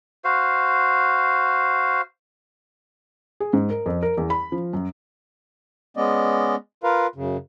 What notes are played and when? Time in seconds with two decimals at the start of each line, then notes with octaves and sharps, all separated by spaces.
0.24 F#4 C5 F5
3.40 G#4
3.53 G#2
3.70 A#4
3.86 F2
4.03 A#4
4.18 E2
4.30 B5
4.52 F3
4.73 F#2
5.97 G#3 B3 C#4 D5 D#5
6.84 F4 A#4 B4 F5
7.16 F#2 C#3